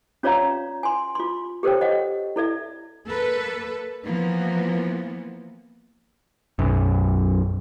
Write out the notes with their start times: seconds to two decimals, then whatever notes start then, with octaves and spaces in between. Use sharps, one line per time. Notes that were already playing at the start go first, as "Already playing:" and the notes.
0.23 C#4 F4 C#5 D5 F5 A#5
0.83 G#5 C6
1.15 F4 C6
1.63 G4 A4 A#4 C5 C#5 G5
1.81 D#5 F#5
2.36 E4 A4 D5 E5
3.06 A#3 A4 B4
4.06 E3 F3 A#3 B3
6.59 B1 F#2